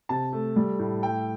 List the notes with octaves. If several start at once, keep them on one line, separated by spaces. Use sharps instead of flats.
C3 A5
A3
G3
A2
A3 G5